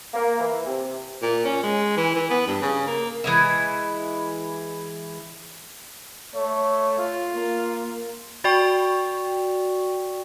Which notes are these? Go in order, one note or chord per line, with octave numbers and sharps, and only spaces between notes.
A#3
E3
C3
A#2
C#4
G#3
E3
E3
B3
G2
C#3
A#3
E3 G#3 E4
A3 C#5
F4
A#3
F#4 D5 G5 C#6